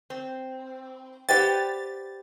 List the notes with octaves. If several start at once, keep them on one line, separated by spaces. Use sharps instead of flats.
C4
G4 B4 C5 D5 F#5 G5 A6